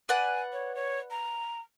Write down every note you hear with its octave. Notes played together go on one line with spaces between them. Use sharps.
B4 D5 F#5 G#5
C#5
C#5
A#5